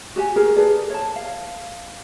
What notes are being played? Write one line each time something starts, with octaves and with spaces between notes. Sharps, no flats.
F#4 G4 G#5
G4 G#4 A#4
G#4 A4 B4 D5
C#5 A5
F5